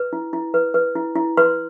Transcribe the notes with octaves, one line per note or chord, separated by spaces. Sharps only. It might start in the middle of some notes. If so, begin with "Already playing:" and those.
Already playing: B4
E4
E4
B4
B4
E4
E4
B4 C6